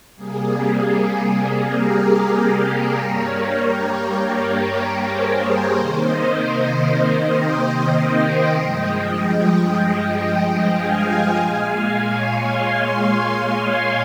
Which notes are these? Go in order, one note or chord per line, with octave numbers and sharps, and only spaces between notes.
C3 G3 A#3 G#4
G4 A#4
G2 G3 A#3 A#4 C#5
G4 A#4
G#4 C5
G#4 C5
C3 D#3 A#3 C5 D#5
D#5 G5
G2 F3 G#3
D#5 G5
D#5 G5
F5 G#5
A#2 G#3 F5 G#5
C#5 F5
G#5 C6